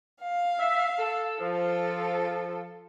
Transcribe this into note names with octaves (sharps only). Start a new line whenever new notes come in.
F5
E5
A4
F3 F4 A4